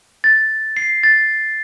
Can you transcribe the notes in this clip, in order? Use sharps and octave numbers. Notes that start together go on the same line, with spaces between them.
A6
C7
A6